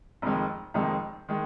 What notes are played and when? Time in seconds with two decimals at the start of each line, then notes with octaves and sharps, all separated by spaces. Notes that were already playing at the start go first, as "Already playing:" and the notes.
0.22 F1 F2 D#3 G#3
0.74 F1 F2 D#3 G#3
1.28 D#3 G#3